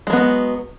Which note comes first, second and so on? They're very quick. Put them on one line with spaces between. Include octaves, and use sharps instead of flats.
G#3 F#3 B3